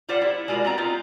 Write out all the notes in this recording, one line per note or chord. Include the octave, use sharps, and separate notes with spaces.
G3 F4 G4 C5 D5 F#5
E4
G#3 F4 F#4 A4 A#4 D5
B3 C4 A#5
D#4 F4 D#5